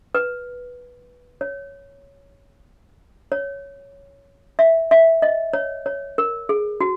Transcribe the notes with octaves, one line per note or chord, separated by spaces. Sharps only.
B4
C#5
C#5
E5
E5
D#5
C#5
C#5
A#4
G#4
F#4